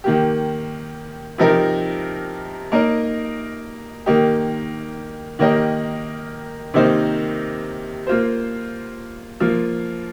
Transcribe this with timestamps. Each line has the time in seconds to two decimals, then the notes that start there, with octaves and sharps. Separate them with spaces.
0.04 D#3 A#3 G4
1.38 C3 F3 D#4 G4 A#4
2.72 A#3 D#4 A#4 D#5
4.06 D#3 A#3 D#4 G4
5.39 D#3 A#3 G4 A#4 D#5
6.74 C3 D#3 A#3 D#4 C5
8.07 A#3 F4 C5
9.40 F3 A#3 F4